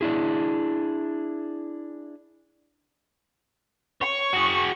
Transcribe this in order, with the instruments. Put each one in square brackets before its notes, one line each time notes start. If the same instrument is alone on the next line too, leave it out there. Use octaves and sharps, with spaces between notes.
[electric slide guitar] D4 E4 G#4
[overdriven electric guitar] C#5 [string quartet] C#6
[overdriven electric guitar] F#4 G#4